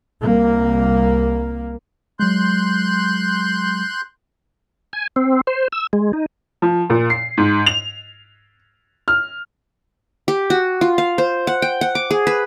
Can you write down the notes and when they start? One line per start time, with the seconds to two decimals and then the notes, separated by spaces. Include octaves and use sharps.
0.23 C2 A#3
2.20 F#3 G#3 C6 F#6 G6
4.93 G#5
5.16 C4
5.47 C5
5.72 E6
5.93 G#3
6.13 D#4
6.62 F3
6.90 A#2
7.10 C7
7.37 G#2
7.66 F7
9.08 F6
10.28 G4
10.50 F#4
10.81 F4
10.98 F5
11.18 C5
11.47 F#5
11.62 G5
11.81 F#5
11.95 D6
12.11 G#4
12.27 B4